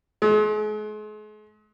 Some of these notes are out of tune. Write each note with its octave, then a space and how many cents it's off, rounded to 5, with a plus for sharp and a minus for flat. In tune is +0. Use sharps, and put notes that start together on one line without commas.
G#3 +40